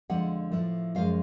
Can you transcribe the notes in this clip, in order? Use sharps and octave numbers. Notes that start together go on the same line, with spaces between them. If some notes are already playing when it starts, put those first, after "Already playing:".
F2 D3 F3 G#3 F#5
A2 F3 A3
F#2 F3 G#3 F5